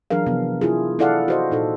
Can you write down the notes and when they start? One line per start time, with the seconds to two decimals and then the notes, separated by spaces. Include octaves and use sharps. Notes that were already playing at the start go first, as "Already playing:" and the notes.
0.10 E3 F#3 D4 G#4 A#4 F5
0.26 C3 F3 B3
0.61 E4 F4 G#4
0.99 E4 A4 D5 F5 F#5
1.28 F#4 C5 D#5
1.51 A#2 D#4 A4